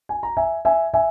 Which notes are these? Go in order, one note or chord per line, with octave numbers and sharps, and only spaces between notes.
G#5
A#5
E5 G#5
E5 G#5
E5 G#5